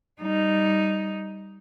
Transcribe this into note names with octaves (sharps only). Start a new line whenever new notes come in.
G3 D#4